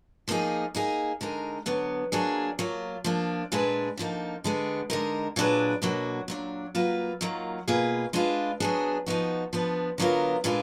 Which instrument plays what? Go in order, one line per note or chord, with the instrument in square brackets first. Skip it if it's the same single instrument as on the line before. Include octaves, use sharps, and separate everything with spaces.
[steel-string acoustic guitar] F3 A#3 D#4 G#4
A#3 D#4 G#4
D3 G#3 D#4 A#4
D3 F#3 B3
F#3 A#3 D4 G#4
F#3 A#3 F4
F3 A#3 D4
A#2 G#3 D4 G#4 B4
D3 F3 A#3 D#4
D3 G#3 B3
D3 G#3 D#4 A#4
A#2 F#3 D4 G#4 B4
B2 F#3 A#3 D4 F#4
A#2 F#3 D4
F#3 A#3 F4 B4
D#3 F#3 A#3 F4
B2 A#3 F4 G#4 B4
G#3 D4 F4 B4
F#3 B3 D4 G#4
F3 B3 D#4 F#4
F3 B3 D4
D3 F#3 B3 F4 A#4
A#2 G#3 D4 F4 B4